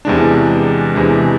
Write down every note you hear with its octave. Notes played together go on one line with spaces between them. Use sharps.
E2 C3 E3 G#3 D4
E2 C3 E3 G#3 D4